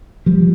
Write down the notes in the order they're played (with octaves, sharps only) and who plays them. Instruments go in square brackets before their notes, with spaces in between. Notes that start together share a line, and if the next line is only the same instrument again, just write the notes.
[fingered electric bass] F3 G3